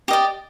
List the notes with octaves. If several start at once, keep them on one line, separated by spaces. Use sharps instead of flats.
G4 D5 D#5